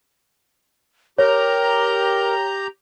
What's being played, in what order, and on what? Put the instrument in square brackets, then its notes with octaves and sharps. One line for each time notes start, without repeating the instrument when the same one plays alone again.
[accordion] G4 A#5 G6 [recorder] A#4 [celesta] C#5